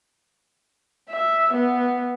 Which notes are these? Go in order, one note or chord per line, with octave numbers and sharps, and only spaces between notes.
E5
B3